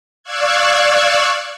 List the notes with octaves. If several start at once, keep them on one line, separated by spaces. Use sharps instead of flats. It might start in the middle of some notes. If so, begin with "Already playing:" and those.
D5 F5 C#6 E6 F#6 G#6